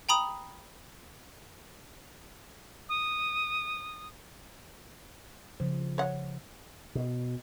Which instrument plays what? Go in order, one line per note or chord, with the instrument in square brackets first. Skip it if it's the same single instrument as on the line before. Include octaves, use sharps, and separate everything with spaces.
[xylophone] G5 A#5 B5 D#6
[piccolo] D#6
[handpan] C#3 F3 C5
[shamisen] C#5 F#5
[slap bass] B2